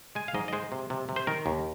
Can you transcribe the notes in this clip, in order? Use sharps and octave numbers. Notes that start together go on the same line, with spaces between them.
G#3 G#5
F5
G#2 D#5
D#5
G#3 C5
C3
C3
C3
C5
D#3 A#4
D#2